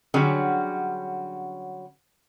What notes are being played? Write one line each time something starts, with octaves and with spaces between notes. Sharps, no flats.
D3 F#3 G3 C#4 G#4